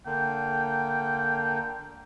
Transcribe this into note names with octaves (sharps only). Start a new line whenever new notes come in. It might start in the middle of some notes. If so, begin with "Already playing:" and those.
D3 A#3 G5